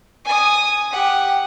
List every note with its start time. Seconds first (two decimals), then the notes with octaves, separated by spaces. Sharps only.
0.25 G#5 D#6
0.91 G4 F#5